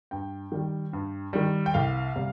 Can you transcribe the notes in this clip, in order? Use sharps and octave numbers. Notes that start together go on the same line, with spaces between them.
G2 G5
D#3 G3
G2
D#3 G3
G5
C2 F5
C3 G3